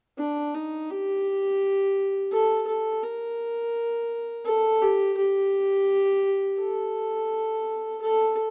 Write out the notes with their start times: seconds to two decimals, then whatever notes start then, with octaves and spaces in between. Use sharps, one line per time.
0.18 D4
0.55 D#4
0.90 G4
2.32 A4
2.67 A4
3.03 A#4
4.46 A4
4.82 G4
5.18 G4
6.59 A4
8.02 A4